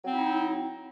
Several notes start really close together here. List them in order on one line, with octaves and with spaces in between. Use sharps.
F#3 C4 E4 D#4